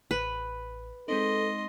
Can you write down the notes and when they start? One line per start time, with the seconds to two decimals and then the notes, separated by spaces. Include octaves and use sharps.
0.11 A1 B4
1.08 G#3 C4 D#4 A4 D#5 C6